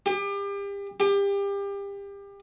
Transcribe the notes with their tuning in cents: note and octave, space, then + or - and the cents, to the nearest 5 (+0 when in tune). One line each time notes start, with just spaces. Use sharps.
G4 +35
G4 +30